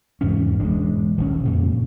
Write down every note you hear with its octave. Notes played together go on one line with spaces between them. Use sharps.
E2 G#2 C#3 C#4
E1 G#3 D4
D#1 A#1 C#4
F2 A#2 C#3